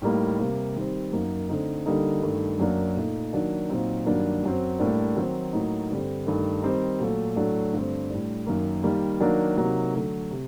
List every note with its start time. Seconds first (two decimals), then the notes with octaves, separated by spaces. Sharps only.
0.02 A2 G3 A#3 D#4
0.39 C3 G3 A#3
0.75 D#3 G3 C4
1.12 F#2 F#3 A#3 D#4
1.49 D3 A3 C4 D#4
1.86 D3 G3 A#3 D#4
2.22 G2 D#3 A3
2.59 F#2 F#3 A#3 D4
2.96 A#2 A3 D#4
3.33 D#3 F#3 A#3 D4
3.69 A#2 F#3 C4 D#4
4.06 G2 D#3 F#3 A#3 D4
4.43 F#2 F#3 C4
4.79 A2 G3 A#3 D4
5.16 D#3 F#3 C4 D#4
5.53 A2 F#3 A#3 D#4
5.90 G2 D3 G3 C4
6.26 G2 D#3 A3
6.63 D#3 G3 C4 D#4
7.00 A#2 F#3 A3
7.36 A2 F#3 A3 D4
7.73 G2 D3 A3 C4
8.10 A2 G3 D4
8.47 F#2 D#3 F#3 A#3
8.83 D#3 G3 A#3
9.20 D#3 F#3 A#3 D4
9.57 C3 F#3 A#3 D#4
9.93 D3 F#3 A3
10.30 C3